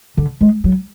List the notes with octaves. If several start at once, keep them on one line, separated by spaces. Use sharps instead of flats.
D3
G#3
F#3